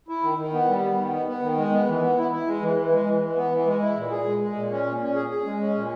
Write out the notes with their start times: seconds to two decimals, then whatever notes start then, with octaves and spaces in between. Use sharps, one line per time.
0.08 E4
0.23 D#3
0.38 D#3
0.53 B3
0.68 G3
0.83 B3
0.98 D#3
1.12 B3
1.27 B3
1.43 D#3
1.57 G#3
1.72 B3
1.87 E3
2.02 B3
2.17 E4
2.32 E4
2.47 G#3
2.62 E3
2.77 E3
2.92 G#3
3.07 E3
3.22 E3
3.36 B3
3.51 E3
3.66 G#3
3.81 E4
3.96 A#2
4.11 G#4
4.26 G#3
4.41 G#3
4.56 A#2
4.71 C#4
4.86 A#2
5.01 C#4
5.15 G#4
5.30 G#4
5.45 G#3
5.60 C#4
5.74 A#2